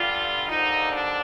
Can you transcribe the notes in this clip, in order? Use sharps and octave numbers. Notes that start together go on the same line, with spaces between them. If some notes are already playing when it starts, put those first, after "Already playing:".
Already playing: G2 D3 G3 F4
D#2 D3 F3 D#4
D4